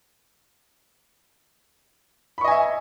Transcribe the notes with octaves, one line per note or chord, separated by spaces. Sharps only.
D#5 E5 G#5 B5 C#6